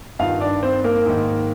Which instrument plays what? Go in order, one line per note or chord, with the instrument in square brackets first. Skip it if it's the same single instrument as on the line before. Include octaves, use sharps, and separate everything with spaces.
[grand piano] G2 D#3 F4 F5
D4 D5
C4 C5
A#3 A#4
G#2 D#3